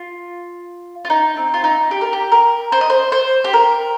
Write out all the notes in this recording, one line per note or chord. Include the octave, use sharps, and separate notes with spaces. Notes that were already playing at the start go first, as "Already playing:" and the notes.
Already playing: F4
F4
D#4
C4
F4
D#4
G4
A#4
G4
A#4
C5
D#5
C5
C5
G4
A#4